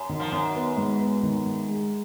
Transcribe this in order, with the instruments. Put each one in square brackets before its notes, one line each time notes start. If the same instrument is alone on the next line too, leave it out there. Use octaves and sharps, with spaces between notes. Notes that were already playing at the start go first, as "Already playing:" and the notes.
Already playing: [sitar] F#2
[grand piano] D#3
[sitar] F3
[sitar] F#2 [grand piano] D#3
[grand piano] B3
G#2
B3
D#3
G#2
G#3